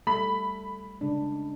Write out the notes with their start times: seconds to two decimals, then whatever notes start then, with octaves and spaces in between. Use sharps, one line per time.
0.07 G3 A3 B5
1.01 C#3 G#3 D4